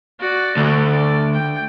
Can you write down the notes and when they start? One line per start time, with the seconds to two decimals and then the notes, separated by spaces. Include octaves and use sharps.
0.20 F#4 D5
0.57 D2 A3
0.91 D5
1.33 G5